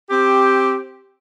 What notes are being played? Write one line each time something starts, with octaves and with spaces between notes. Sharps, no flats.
C4 G4